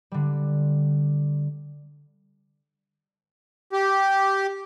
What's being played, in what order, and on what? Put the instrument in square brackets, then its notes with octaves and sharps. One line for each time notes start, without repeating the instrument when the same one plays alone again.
[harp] D3 G3
[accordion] G4